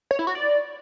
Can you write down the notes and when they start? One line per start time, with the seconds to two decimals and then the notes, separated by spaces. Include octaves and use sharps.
0.11 C#5
0.19 E4
0.27 F#4
0.35 D5